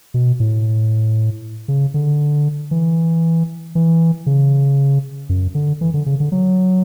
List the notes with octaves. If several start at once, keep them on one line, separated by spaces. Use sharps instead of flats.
B2
A2
C#3
D3
E3
E3
C#3
F#2
D3
E3
D3
C#3
D3
F#3